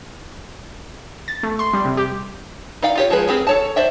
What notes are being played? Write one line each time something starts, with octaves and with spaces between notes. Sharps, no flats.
A6
A3
C6
G3
C3
G4
D#4 D5 F5 G5
F4 G4 C#5
F3 G#3 G#4 B4
C4 G4 G#4 A#4 B4
A4 C#5 A5
C5 D5 E5 G5